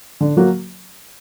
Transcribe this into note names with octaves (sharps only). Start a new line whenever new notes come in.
D3
F#3 A#3 F#4